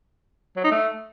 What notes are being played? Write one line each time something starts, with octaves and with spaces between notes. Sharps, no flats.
F#3
D#4
A3